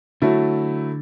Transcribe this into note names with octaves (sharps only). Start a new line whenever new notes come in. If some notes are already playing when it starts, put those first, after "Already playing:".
D3 F#3 A3 E4